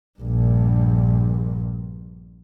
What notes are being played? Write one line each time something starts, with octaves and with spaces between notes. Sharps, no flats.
A#1 G2